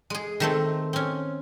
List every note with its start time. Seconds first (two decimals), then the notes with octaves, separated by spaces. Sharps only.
0.10 G#3 G#4
0.40 D#3 A3 C4
0.93 C4 C#4